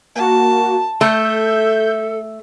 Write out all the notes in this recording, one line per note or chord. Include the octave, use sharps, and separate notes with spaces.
A#3 F#4 A5
A3 A4 E5 G6